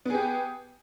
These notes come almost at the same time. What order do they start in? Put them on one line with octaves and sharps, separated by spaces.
B3 G#4 G4